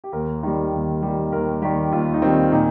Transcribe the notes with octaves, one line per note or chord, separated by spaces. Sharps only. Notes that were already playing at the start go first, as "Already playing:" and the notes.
G4
D#2 A#4
D#3 G3
D#2
D#3 G3
D#2 A#4
D#3 G3 G4
D#2 F4
D#4
D#3 G3 C4
F4
A#2 D#4